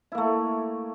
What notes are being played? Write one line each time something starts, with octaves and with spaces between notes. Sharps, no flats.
A3 A#3 E4